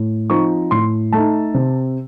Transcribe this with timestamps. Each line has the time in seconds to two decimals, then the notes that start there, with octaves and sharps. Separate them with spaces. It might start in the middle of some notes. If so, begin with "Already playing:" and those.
Already playing: A2
0.30 F3 C4 D#4 C#6
0.71 A2 C6
1.13 A3 D#4 A5
1.54 C3